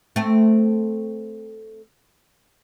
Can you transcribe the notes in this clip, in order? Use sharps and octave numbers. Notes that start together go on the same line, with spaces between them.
A3 C4